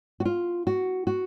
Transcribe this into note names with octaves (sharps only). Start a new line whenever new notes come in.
F#4
F4
F#4
F#4